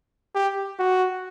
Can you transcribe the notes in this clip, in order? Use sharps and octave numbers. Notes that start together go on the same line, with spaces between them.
G4
F#4